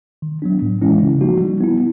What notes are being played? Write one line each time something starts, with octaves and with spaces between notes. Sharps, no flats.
D#3
F#3 B3 D4
A2
E3 G#3 C#4 E4
C#3
F3 A#3 D#4 F#4
G3
B3 E4